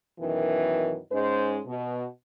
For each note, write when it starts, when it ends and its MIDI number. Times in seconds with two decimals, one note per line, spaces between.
0.20 0.97 42
0.20 0.97 47
0.20 0.97 51
0.20 0.97 52
1.12 1.58 44
1.12 1.58 56
1.12 1.58 61
1.12 1.58 72
1.66 2.05 47